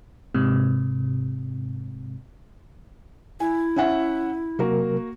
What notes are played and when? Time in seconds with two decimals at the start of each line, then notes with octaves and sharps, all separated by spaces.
0.35 G#2 C3
3.40 E4 G#5
3.76 C#4 E5 F#5
4.59 C3 F#3 A#3 F#4 A#4